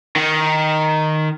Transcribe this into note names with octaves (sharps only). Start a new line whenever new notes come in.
D#3